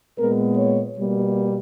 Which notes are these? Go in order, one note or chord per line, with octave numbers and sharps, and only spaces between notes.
A#2 G#3 B3 A#4
C#5
B2 G3 A#3